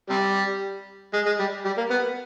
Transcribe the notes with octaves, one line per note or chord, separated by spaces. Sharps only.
C3 G3
G#3
G#3
G3
G3
A#3
B3